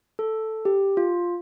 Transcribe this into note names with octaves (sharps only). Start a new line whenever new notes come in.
A4
G4
F4